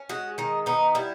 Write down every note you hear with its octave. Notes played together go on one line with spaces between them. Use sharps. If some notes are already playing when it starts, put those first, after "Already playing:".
Already playing: C#4
G#3 F#4
D#3 D#4
B3 D#4
G3 E4